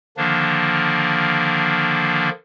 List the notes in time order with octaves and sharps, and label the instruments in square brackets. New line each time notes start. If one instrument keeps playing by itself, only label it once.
[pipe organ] D3 D#3 F3 A#3 D4